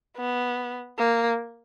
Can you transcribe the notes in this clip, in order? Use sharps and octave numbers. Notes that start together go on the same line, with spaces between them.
B3
A#3